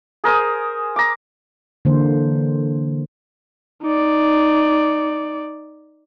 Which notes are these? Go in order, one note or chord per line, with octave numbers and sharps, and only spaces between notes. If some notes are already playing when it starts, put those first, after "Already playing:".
G#4 A#4 C5 D#6
A#5 D6
D3 E3 A#3 C5
D#4 D5